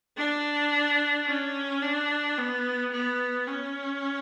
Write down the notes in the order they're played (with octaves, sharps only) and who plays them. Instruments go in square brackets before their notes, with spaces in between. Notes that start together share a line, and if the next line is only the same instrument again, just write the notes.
[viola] D4
C#4
D4
B3
B3
C#4